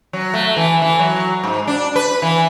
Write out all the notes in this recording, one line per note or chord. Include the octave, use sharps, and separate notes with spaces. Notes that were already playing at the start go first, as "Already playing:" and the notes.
F#3
A3
E3
E3
F#3
G#2
D4
B4
E3